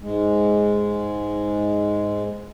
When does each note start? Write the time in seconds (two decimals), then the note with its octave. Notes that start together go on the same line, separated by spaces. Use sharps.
0.03 G#2 G#3